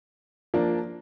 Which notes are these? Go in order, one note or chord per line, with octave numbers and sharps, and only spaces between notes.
F3 A#3 D4